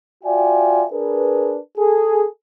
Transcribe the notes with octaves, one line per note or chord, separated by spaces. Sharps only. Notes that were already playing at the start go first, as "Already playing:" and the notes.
F4 F#4 D5 E5 G5 G#5
D4 G#4 A#4 B4
G#4 A4